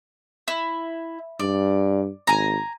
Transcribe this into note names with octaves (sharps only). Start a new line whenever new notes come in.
E4
G2 D5
G#1 G#5 A#5